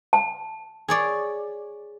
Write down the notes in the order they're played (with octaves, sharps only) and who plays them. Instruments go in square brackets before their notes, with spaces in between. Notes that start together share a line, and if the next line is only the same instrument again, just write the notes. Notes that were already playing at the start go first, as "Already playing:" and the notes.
[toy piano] A5
[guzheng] G#4 C#5 D5